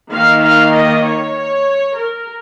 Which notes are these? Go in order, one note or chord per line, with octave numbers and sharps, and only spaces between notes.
D#3 A#3 D#4 F5
F5
D#5
C#5
A#4